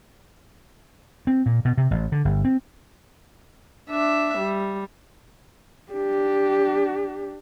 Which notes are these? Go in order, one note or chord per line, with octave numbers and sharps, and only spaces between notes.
C4
A#2
B2
C3
A1
D3
G1
C4
D4 E5
G3
D4 G4